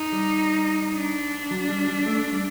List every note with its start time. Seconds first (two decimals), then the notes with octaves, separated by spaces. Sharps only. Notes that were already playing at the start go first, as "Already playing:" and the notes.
Already playing: D#4
0.13 G3
0.96 D4
1.51 F#3
1.69 G3
1.88 G3
2.06 A3
2.33 G3